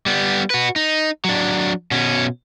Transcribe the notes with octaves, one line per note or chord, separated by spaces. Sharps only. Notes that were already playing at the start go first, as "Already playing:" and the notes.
G3 B3
F#4 B4
D#4
F#3 D4
B2 C#4